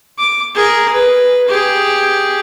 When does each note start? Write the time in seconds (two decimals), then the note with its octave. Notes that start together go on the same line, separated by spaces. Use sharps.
0.19 D6
0.55 G#4 A#4
0.94 B4
1.48 G4 G#4